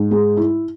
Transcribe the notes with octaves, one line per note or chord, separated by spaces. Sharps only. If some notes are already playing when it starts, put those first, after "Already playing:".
Already playing: G#2
G#3
E4